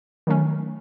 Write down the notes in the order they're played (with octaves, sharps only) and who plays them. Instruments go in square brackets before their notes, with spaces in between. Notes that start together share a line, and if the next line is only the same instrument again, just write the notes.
[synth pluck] D#3 F#3 A3 C#4